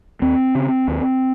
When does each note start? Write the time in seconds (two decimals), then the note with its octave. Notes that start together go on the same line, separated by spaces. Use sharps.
0.22 D#2 C4
0.55 C#3
0.88 D#2